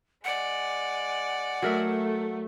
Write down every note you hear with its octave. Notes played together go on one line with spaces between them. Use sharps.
G#3 D5 F#5
F#3 A3 A#4 E5